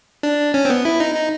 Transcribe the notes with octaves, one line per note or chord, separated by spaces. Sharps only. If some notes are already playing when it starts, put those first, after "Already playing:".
D4
C#4
C4
B3
E4
D#4
D#4